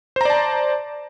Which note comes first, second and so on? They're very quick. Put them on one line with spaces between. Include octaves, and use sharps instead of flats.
C5 A#5 D5 A5